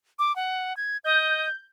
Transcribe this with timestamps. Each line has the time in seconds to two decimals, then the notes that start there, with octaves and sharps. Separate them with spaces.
0.19 D6
0.36 F#5
0.77 G#6
1.04 D#5 G6